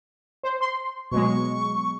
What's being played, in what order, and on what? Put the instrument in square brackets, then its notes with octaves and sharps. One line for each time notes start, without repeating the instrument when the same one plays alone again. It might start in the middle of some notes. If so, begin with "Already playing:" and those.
[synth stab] C5
C6
[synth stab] B2 F#3 G#3 [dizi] C#6